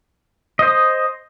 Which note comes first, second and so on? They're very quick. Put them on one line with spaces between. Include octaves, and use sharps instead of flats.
D#5 C5 D#6